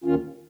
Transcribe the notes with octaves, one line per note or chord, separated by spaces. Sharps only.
D#2 D#3 C#4 F4